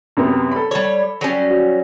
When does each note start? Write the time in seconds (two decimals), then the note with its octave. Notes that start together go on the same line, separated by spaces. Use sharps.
0.17 F#2 C3 B3
0.52 A4 B5
0.71 G3 C#5
1.21 F#3 G3 C#4
1.50 F#4